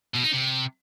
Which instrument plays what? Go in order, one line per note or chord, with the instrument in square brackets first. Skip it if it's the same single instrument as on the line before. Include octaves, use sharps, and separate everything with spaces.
[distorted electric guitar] B2
D#4
C3